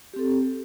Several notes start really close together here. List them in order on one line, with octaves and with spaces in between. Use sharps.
G4 C4 A4